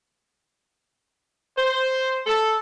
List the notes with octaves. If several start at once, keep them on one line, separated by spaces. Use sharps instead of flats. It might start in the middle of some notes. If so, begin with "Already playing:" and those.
C5
A4